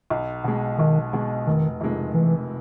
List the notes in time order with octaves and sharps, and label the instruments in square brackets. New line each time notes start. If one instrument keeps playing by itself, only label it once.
[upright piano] B1
B2 G#3
[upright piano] B1 [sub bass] D#3
[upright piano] B2 G#3
[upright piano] F1 [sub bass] D#3
[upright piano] F2 C3 D#3 G#3
[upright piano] F1 [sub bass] E3